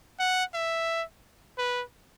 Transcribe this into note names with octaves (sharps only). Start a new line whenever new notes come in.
F#5
E5
B4